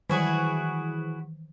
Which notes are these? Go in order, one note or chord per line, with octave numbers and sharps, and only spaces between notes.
D#3 E3 E4 F#4 G#4